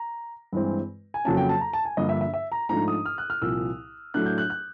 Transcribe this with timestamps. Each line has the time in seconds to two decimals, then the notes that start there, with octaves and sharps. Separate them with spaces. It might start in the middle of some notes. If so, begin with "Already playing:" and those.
Already playing: A#5
0.53 G2 E3 G#3 C4
1.14 G#5
1.25 F2 C#3 F#3 A#3 C#4 A5
1.37 G5
1.49 A5
1.61 A#5
1.73 A5
1.85 G#5
1.97 G2 D3 F3 A#3 D4 D#5
2.09 E5
2.21 E5
2.34 E5
2.52 A#5
2.69 G#2 F3 A3 D4 A#5
2.88 D#6
3.06 F6
3.18 F#6
3.30 F6
3.42 C2 A#2 F3 E6
4.14 A2 F#3 A3 D4 F#6
4.26 G6
4.38 F#6
4.50 F#6